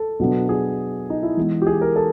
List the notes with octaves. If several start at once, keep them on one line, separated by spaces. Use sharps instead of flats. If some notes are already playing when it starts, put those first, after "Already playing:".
Already playing: A4
B2 F#3 B3 D4
G#4
D#4
E4
E3 G#3 B3
G4
G#4
A#4
A4